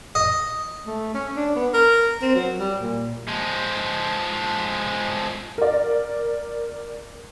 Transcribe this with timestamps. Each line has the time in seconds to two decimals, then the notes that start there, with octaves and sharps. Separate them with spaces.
0.15 D#5
0.87 A3
1.14 C#4
1.36 D4
1.56 B3
1.74 A#4
2.22 C4
2.35 F#3
2.59 G3
2.80 A#2
3.28 F3 G#3
5.58 A#4 D5